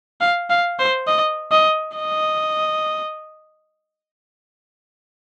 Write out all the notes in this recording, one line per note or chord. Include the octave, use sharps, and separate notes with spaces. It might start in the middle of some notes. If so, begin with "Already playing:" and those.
F5
F5
C5
D#5
D#5
D#5